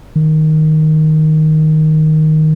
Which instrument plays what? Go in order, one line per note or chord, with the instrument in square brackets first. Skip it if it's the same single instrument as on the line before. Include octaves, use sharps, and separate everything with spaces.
[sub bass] D#3